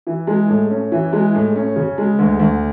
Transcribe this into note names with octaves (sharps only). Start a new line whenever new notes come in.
E3
G#3
A2
C#4
E3
G#3
A2
C#4
C#3
G#3
D2
D2